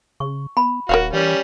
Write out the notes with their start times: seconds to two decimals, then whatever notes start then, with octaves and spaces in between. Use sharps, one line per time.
0.20 C#3 C#6
0.57 B3 B5
0.89 D#1 F#4 A#4 C#5 F5
1.13 E3 G3 C#4